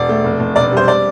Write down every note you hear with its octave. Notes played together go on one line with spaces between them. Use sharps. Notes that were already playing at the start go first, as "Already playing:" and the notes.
Already playing: E1 D5
A3
F1
F1
E1 D5
G3 C5
D5